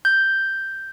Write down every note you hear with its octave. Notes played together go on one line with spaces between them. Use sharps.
G6